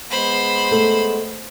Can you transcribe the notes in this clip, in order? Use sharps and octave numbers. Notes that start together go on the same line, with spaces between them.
G#3 B3 C5 B5
A3